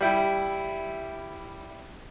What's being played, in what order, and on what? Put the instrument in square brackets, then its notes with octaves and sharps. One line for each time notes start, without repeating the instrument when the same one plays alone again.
[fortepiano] G3 E4 G5